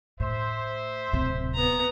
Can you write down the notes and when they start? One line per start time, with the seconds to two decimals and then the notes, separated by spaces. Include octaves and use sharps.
0.20 A2 C5 E5
1.13 D1 C3
1.54 B3 A#5